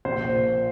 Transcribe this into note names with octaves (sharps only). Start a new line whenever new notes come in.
A#1 C5
A#2